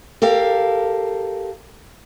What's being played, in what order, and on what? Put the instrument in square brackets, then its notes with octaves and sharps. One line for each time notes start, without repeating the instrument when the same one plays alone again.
[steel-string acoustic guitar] G4 A4 A#4 F5